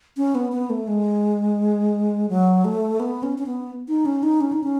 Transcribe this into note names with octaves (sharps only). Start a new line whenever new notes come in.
C#4
B3
B3
A3
G#3
F#3
A3
B3
C#4
C#4
B3
D#4
C#4
D#4
C#4
D#4
C#4